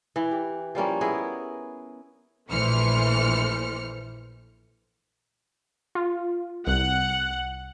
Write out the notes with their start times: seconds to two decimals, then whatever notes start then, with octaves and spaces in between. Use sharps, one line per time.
0.16 E3
0.31 G4
0.75 F3 G3 A#3 C#4
1.01 B3 E4 G#4 A#4
2.50 A#1 E3 A3 C5 F6 C#7
5.95 F4
6.67 C2 F#5